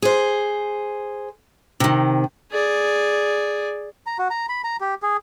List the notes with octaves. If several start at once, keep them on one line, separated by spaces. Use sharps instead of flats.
G#4 C5
C3 D#3
G#4 D5
A#5
F#4
A#5
B5
A#5
G4
G#4